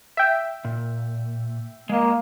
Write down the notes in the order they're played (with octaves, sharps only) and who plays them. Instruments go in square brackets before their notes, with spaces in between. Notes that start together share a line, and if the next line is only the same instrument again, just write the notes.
[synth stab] E5 G5
[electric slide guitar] A#2
[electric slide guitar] G#3 D#5 [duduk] A#3